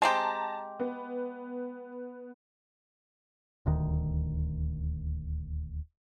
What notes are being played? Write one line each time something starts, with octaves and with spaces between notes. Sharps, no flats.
G#3 C4 G4 A5 A#5
B3
D#1 D2 D#3